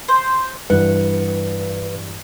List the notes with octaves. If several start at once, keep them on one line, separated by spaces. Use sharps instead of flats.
C5
G2 E3 B4 F#5